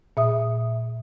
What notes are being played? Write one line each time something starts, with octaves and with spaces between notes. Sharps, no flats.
A#2 E5 D#6